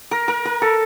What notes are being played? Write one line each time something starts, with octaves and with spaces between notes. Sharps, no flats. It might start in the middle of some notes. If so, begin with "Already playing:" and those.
A#4
A#4
A#4
A4